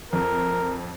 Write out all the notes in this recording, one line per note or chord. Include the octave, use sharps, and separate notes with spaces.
F2 A#4